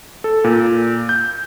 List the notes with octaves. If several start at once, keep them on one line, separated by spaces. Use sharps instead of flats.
A4
A#2
G6